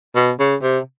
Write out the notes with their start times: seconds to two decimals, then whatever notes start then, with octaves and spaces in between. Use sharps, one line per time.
0.15 B2
0.39 C#3
0.62 C3